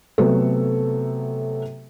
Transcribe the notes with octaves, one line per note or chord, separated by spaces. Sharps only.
C3 F#3 A3 B3 A4